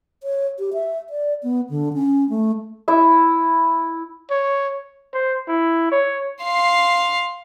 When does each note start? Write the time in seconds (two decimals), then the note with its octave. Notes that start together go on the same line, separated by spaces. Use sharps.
0.23 C#5
0.59 G4
0.73 E5
1.10 D5
1.43 B3
1.69 D3
1.94 C#4
2.29 A3
2.88 E4 E5
4.30 C#5
5.14 C5
5.48 E4
5.92 C#5
6.43 F5 C6